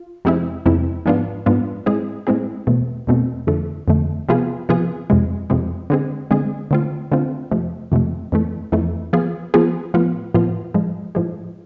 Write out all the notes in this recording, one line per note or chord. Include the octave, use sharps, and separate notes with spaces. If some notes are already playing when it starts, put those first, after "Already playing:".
Already playing: F4
F2 C3 G#3 C4 E4
F2 C3 G#3 C4 E4
G#2 F3 B3 D4 F4
G#2 F3 B3 D4 F4
A2 G#3 C4 E4 G#4
A2 G#3 C4 E4 G#4
E2 B2 A3 C4
E2 B2 A3 C4
F2 D3 A3
F2 D3 A3
C3 F3 B3 F4 G#4
C3 F3 B3 F4 G#4
F2 C3 G#3
F2 C3 G#3
D3 G#3 C4 G#4
D3 G#3 C4 G#4
D3 A3 C4 F4
D3 A3 C4 F4
F2 C3 F3 A3
F2 C3 F3 A3
F2 E3 A3
F2 E3 A3
F3 B3 F4 G#4
F3 B3 F4 G#4
A2 F3 B3 F4
A2 F3 B3 F4
A2 F3 G#3
A2 F3 G#3